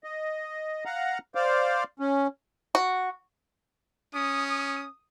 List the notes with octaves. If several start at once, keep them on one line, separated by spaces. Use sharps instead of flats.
D#5
F5 F#5 A#5
C5 D5 F5
C#4
F#4
C#4 D#6